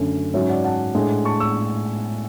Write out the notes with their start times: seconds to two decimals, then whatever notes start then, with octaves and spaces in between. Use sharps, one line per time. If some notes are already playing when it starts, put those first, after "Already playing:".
Already playing: F#2 D3 A3 C#4
0.34 G#2 F#3 C#4 C#5 E5
0.49 D5 F#5
0.64 F#5 A5
0.94 A2 G#3 D4
1.25 A5 C#6
1.40 C#6 E6